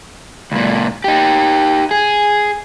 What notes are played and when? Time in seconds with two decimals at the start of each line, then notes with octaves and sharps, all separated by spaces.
0.52 C#2 A#2
1.04 D#4 G4
1.91 G#4